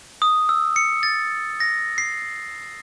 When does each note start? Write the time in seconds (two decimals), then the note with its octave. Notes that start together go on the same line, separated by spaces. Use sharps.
0.22 D#6
0.49 E6
0.76 C#7
1.03 A6
1.60 A#6
1.98 C7